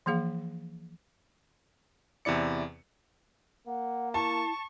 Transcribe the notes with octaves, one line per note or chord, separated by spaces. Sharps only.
E3 F3 A#3 G#4 F5
E2 C3 E4 D5 C#7
A#3 F#5
E4 A5 C#6